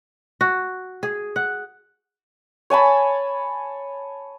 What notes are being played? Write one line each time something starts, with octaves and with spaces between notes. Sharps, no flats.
F#4
G#4
F#5
C#5 G#5 A5 B5